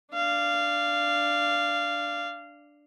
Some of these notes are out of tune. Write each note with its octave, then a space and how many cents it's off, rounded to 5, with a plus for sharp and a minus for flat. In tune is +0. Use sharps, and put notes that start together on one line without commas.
D4 +0 F5 -15